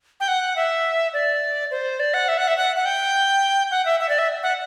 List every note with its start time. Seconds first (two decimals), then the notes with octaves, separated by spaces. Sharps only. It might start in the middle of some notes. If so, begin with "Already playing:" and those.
0.20 G5
0.28 F#5
0.56 E5
1.13 D5
1.71 C5
2.00 D5
2.14 F#5
2.28 E5
2.38 F#5
2.48 E5
2.57 F#5
2.76 F#5
2.85 G5
3.71 F#5
3.86 E5
4.00 E5
4.09 D5
4.19 E5
4.43 F#5